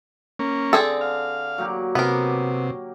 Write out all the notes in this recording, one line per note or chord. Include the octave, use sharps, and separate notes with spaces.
A#3 C#4
D3 C4 G#4 A4
F5
F#3 A#3 G4
C3 B3 A#4